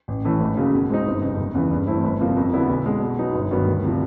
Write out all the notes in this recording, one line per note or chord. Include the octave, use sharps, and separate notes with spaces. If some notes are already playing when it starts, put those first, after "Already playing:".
A1
A2 E3 A3 C#4
G#1
F#2 C#3 F#3 A#3
B2
G#3 C4 D#4
G1
F2 C3
F#1
E2 C#3 E3
G2
E3 A3 C4 E4
G1
F2 C3 F3 A#3
F2
D3 F#3 B3 E4
B1
B2 G#3
B2
F#3 B3 D#4
G1
G2 D#3 F#3 B3
D2
C3 F3